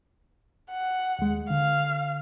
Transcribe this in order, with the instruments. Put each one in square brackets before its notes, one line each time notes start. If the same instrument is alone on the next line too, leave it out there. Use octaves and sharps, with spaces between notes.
[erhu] F#5
[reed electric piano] D#2 G#3
[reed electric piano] D3 [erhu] F5